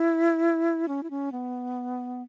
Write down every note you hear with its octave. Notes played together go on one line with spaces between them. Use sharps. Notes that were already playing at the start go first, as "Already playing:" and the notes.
Already playing: E4
C#4
E4
C#4
B3